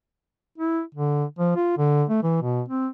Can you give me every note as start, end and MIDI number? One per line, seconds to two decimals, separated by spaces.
0.58 0.81 64
0.95 1.24 50
1.39 1.56 53
1.56 1.77 65
1.78 2.04 50
2.10 2.21 57
2.23 2.42 52
2.42 2.62 47
2.69 2.87 60